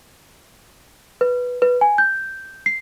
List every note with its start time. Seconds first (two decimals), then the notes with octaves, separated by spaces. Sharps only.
1.21 B4
1.62 B4
1.81 G#5
1.98 G6
2.66 C7